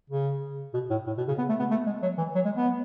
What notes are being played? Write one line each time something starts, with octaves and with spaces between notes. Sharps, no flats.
C#3
B2
A2
A2
B2
C#3
B3
A3
B3
A3
G#3
F#3
E3
F#3
G#3
B3